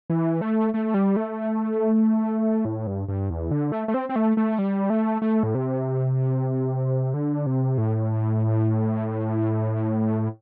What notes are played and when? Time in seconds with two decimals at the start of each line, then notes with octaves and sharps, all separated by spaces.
0.10 E3
0.41 A3
0.74 A3
0.94 G3
1.16 A3
2.65 A2
2.87 G2
3.09 G2
3.30 E2
3.51 D3
3.72 A3
3.88 A3
3.94 C4
4.09 C4
4.16 A3
4.37 A3
4.58 G3
4.90 A3
5.22 A3
5.43 A2
5.55 C3
7.14 D3
7.46 C3
7.78 A2